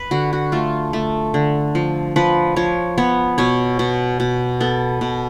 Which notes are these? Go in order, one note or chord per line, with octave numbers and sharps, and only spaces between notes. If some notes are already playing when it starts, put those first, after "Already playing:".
Already playing: B4
D3 F#4
F#4
A3 F4
A3
D3
F3
F3 B4
F3 C#5
B3 C#5
B2 C#5
B2
B2
B3 A4
B2